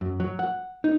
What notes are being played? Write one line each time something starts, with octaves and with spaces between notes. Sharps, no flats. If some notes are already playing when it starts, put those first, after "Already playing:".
F#2
F#3
F#5
D#4